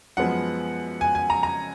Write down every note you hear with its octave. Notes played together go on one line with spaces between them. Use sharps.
F#2 F3 G#3 B3 F#5
G#5
G#5
A#5
A#5